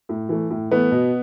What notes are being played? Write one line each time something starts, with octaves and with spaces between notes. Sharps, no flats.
A2
E3 A3
A2
E3 A3 B3 B4
B2